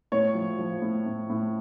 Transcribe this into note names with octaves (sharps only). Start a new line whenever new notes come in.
A2 C#5
F3
F3
A2
A2
A2